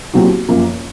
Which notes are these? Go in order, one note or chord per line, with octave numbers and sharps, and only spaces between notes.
C2 A#2 F#3 C4 F#4
F#2 F3 A#3 C#4